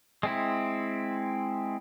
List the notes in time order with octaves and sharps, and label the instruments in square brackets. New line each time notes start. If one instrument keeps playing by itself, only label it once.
[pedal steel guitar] G#3 C4 E4